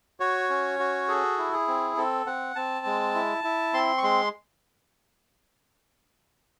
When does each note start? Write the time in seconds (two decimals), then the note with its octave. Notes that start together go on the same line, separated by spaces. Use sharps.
0.20 F#4 C#5
0.50 C#4
0.79 F#4
1.08 G#4 A4
1.38 E4
1.53 G#4
1.68 C4
1.97 C4 A4
2.26 C4 F#5
2.56 C4 A5
2.86 G#3
3.15 E4
3.44 E4
3.74 C4 C6
3.97 C#6
4.03 G#3 C6